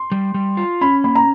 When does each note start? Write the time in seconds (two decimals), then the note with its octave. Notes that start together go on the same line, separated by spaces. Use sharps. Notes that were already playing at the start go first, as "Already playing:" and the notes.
Already playing: C6
0.12 G3
0.34 G3
0.57 F4
0.81 C#4 B5
1.04 A#3 B5
1.15 A#5